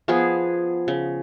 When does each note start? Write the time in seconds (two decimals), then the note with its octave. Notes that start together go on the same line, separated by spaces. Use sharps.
0.08 F3 B3 G#4
0.88 C#3